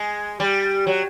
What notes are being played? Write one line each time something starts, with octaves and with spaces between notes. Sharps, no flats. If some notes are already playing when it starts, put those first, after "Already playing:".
Already playing: G#3
G3
F#3